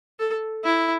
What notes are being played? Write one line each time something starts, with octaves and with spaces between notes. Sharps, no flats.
A4
E4